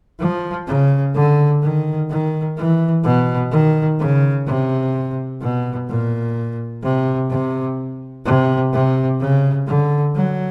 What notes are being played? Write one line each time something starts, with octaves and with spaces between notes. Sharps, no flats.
F3
C#3
D3
D#3
D#3
E3
B2
D#3
C#3
C3
B2
A#2
C3
C3
C3
C3
C#3
D3
F#3